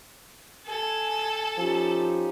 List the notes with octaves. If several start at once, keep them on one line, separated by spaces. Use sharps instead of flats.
A4 G#5
F3 C#4 D#4 G4